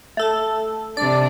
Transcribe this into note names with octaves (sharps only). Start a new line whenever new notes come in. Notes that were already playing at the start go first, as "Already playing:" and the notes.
A3 A4
C3 D4 D5